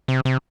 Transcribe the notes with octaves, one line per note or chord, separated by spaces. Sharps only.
C3
C3